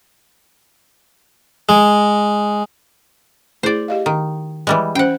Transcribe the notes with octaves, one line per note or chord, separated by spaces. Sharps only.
G#3
A3 E4 G#4 C5 D5
G4 D#5 F5
D#3
E3 G3 G#3
C#4 C5 F#5 G5